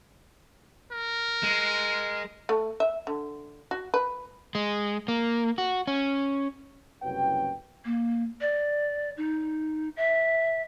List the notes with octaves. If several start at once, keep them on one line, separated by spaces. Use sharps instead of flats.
A#4
G#3
A3
E5
D3
F#4
B4
G#3
A#3
F#4
C#4
F#1 C2 F#3 C#4 B4 G5
A#3
D5
D#4
E5